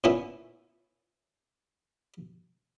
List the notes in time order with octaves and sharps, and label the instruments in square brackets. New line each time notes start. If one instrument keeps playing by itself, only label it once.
[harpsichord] A#2 B3 C#4 E4